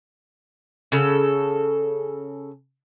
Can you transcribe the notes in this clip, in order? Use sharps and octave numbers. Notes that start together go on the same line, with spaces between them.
C#3 A4